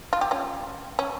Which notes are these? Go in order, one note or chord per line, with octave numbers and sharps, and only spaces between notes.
F4
G4
C#4 F4
C#4